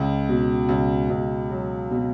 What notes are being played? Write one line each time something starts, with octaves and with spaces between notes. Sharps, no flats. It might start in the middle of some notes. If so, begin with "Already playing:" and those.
Already playing: C#2
B2
C#2
C#2
F#3
B2